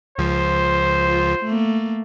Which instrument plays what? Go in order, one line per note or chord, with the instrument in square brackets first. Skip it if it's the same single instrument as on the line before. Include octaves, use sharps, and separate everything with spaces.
[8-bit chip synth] C#2 F3 [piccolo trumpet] C5
[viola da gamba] F4
A3 A#3